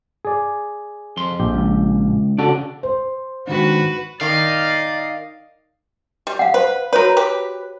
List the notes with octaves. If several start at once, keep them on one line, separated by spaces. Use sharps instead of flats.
G#4 D5
F2 C6
A#1 G4
C#2
C#3 D4 F#4 A4 D5
C5
G#2 D#3 D4 F#4 B4
D#3 D#4 D5 D#5 F5
G3
F5 F#5
B4 C5
F#4 A#4 B4 C#5
G4 B4